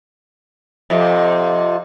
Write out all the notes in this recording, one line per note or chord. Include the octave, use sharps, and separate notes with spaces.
F2 C3